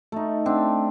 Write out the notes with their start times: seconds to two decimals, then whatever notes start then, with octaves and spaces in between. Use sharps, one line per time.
0.12 A3 D#4
0.46 C4 D4